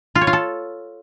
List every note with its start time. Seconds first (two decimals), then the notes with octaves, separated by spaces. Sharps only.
0.15 F4
0.21 C#5
0.27 F4
0.33 A4